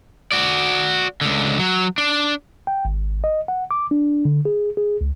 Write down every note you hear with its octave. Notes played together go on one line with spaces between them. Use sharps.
F#4 D5
C#2 D3
F#3
D4
G5
G#1
D#5
F#5
D6
D4
D3
G#4
G#4
C#2